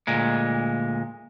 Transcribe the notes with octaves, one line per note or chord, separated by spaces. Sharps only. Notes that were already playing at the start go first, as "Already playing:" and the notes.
D2 A#2 G#3